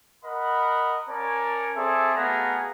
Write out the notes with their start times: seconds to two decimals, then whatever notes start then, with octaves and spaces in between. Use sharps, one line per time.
0.24 A#4 D#5 F#5 B5
1.08 C#4 A#4 C#5 D5 A5
1.76 C4 G#4 A4 D5 E5
2.16 A3 B3 F#4 G#4 F5 A#5